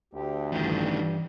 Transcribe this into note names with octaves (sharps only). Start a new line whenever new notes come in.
D2 G4
A1 G2 D#3 F3 G3